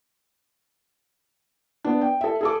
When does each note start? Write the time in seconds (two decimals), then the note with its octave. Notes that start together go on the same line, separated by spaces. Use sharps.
1.84 B3 D4
2.01 G5
2.21 A4 E5
2.41 G#4 A4 D6